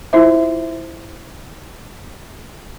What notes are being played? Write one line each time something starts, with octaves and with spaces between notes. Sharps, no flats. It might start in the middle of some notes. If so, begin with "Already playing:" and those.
E4 F4 C5 E5